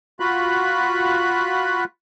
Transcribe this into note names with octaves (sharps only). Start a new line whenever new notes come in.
F4 F#4 B5 F#6